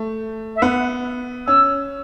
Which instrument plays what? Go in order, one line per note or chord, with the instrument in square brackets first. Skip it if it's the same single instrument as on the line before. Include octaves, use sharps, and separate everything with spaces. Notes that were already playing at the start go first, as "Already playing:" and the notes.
Already playing: [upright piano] A3
[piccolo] E5
[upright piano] B3 [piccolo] F#5
[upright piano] C#4 [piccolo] E6